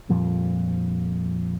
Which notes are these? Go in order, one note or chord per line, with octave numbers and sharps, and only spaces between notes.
F2 A#2 F3 G3